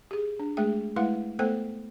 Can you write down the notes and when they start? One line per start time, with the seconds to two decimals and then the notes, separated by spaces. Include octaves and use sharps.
0.11 G4 G#4
0.40 D4
0.57 G#3 A3 G#4 G5
0.96 G#3 A3 E4 B4 F5 F#5
1.39 A3 B3 A4 C5 G5